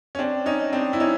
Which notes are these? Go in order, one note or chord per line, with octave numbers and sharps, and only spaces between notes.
C#4
C4 D4
C#4 D#4
C4 D4
E4
C#4 D#4